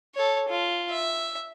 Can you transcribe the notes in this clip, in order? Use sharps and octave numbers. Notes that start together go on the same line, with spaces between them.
A4 C#5
F4
E5